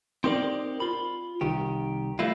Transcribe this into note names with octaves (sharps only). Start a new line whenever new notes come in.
C4 D#4 G4 A#4 C5 D5
F4 B5
C2 D#3 G4
G3 A3 A#3 E4 F4